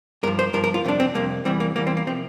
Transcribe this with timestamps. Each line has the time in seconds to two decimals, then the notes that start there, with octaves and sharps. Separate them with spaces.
0.23 G2 A#4
0.27 F3
0.39 C5
0.53 G2 F3 A#4
0.64 A#4
0.74 F4
0.84 F2 C3 G3 D4
1.00 C4
1.15 F2 C3 G3 A#3
1.45 E2 E3 G3 C4
1.60 A#3
1.76 E2 E3 G3 A#3
1.87 C4
1.97 A#3
2.07 C3 F3 C4